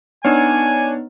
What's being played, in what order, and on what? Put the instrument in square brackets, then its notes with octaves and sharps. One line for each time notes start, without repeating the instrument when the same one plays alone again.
[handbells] B3 D#4 [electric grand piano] D4 C#5 [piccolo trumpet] G#5